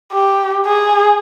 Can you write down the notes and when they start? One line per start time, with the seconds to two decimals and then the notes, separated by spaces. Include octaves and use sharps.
0.12 G4
0.66 G#4